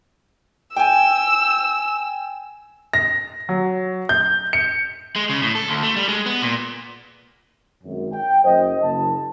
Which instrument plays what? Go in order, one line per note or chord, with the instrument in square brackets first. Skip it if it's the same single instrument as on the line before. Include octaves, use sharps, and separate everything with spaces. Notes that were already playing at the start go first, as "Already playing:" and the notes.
[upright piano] G5 G#5 [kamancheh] E6
[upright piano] A#6
F#3
G6
C#7
[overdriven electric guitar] G#3
C#3
A2
A4
D2
A3
G3
G#3
B3
A#2
[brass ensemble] G#1 F#2
G5
F#1 C5 D#5
F#1 A5